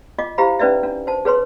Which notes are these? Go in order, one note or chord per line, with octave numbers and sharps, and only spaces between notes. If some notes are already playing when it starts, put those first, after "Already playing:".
F4 D#5 D6
E4 G4 C5 F5 A#5 B5
C#4 D#4 B4 D5 E5
D4
C5 A5
G#4 B4 C#5 C6